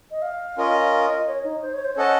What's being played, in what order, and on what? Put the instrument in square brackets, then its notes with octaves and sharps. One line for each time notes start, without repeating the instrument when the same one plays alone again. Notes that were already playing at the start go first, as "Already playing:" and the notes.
[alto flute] D#5
F5
[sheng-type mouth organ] C#4 F4 A#4 D#5
[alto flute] F5
D#5
C#5
D#4
C5
C#5
C5
[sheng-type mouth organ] C#4 A4 D#5 F#5 A5 [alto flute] C#5